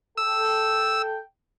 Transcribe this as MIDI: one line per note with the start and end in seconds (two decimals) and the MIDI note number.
0.17 1.19 69
0.17 1.19 79
0.17 1.02 88